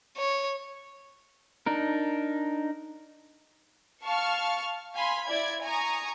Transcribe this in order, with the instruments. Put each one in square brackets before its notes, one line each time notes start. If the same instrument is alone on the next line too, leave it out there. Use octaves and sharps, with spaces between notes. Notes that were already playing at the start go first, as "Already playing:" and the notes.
[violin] C#5
[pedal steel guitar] D4 D#4 A#4
[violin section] F5 A5 C#6 F6
F5 G#5 B5 C6
E4 D5 G#6
G#5 A#5 C#6 D#6